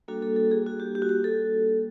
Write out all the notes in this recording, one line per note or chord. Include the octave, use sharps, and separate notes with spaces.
G3 A#3 D4 F#4 A4
A4
A4
G#4
F#4
G4
G4
F#4
G4
A4